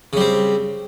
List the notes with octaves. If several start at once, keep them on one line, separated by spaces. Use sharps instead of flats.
C#3 G3 C4